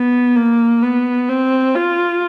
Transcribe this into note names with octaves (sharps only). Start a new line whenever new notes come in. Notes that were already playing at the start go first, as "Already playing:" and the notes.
Already playing: B3
A#3
B3
C4
F4